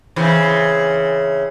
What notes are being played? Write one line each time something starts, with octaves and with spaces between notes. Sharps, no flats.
C#3 E3 C4